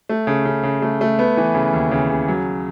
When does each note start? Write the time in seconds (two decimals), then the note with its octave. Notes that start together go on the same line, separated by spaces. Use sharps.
0.09 A3
0.27 C#3
0.45 C#3
0.63 C#3
0.82 A3
1.01 A3
1.19 B3
1.37 E3
1.54 C#3
1.73 D#2
1.91 C#3
2.09 C#3
2.28 F#3